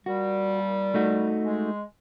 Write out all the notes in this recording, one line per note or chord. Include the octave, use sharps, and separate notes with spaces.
A#2 G3 F#4
A3 D#4 F#4
G#3